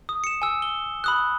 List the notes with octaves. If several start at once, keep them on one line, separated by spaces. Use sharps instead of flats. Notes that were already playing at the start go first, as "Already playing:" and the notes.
D#6
C#7 E7
G#5 E6
G7
B5 D#6 F#6